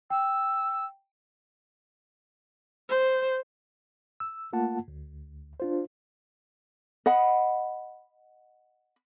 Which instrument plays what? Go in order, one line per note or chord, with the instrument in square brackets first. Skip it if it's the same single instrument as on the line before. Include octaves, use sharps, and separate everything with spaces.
[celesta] G5 [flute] E6
[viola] C5
[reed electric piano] E6
A3 A#3 F4 F#5 A5
D2
D4 F4 C5
[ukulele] D#5 F#5 B5